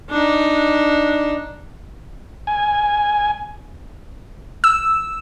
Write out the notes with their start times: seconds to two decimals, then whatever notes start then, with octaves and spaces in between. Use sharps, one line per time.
0.10 D4 D#4
2.47 G#5
4.64 E6